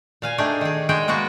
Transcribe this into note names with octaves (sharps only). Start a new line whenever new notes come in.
A#2 F5 G#5
A3 D4 D#4 G4 G#4
D#3 G#4
G#3 F#4 G#4 G5
G#3 A#3 B3 F#4